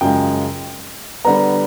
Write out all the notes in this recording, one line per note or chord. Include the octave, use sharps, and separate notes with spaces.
F#2 C#3 F3 G#3 G5
D3 G3 B3 A#5